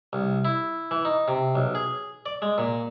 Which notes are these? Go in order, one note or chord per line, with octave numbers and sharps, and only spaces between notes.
C2
E4
E3
D#4
C3
B1
G#4
D5
G#3
A#2